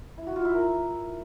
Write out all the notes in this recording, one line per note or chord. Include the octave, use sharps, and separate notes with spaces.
E4
F#4
F4
E4
A#4